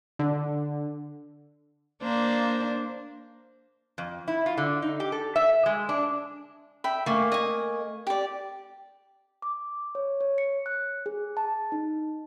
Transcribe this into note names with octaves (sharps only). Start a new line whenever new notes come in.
D3
A#3 D4 C5
F2
E4
F4
D3
D#4
G4
A4
E5
G#3
D4
E5 G5 B5
A3 A#3 G#5
D#5 G#5
G4 D5
D6
C#5
C#5
C#7
F#6
G#4
A5
D#4